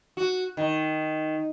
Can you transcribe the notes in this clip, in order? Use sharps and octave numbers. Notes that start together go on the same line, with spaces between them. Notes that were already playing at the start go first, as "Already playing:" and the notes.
F#4
D#3